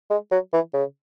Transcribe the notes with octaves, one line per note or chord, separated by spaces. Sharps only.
G#3
F#3
E3
C#3